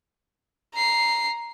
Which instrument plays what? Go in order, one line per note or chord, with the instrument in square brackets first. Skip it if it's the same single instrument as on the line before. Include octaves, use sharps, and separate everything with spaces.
[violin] A#5 C7